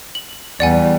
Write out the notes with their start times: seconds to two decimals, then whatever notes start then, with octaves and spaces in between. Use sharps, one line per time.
0.15 F#7
0.60 E2 G3 B3 D5 F#5 G#5